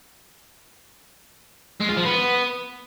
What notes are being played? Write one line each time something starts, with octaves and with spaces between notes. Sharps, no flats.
G#3
F4
F3
B3